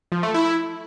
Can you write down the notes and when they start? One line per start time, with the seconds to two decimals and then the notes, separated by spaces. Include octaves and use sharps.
0.12 F3
0.23 A3
0.34 E4